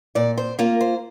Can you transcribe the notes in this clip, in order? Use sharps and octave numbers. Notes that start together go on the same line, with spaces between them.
A#2 D5
C5
A#3 F4 A#4
C5